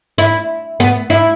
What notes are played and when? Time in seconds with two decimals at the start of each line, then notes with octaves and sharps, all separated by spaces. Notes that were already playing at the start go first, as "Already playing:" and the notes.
0.18 E4
0.80 B3
1.10 E4